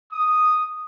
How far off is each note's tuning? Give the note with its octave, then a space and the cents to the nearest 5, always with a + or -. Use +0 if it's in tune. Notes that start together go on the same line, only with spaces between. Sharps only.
D#6 -5